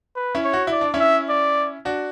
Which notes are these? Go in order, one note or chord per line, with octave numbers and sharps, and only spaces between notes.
B4
C#4 E4
C#5
F#4
E4 D5
D4
C#4 E4
E5
D5
D4 F#4